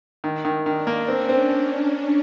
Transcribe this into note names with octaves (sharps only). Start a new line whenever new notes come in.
D#3
D#3
D#3 D4
A#3
C4 C#4
C4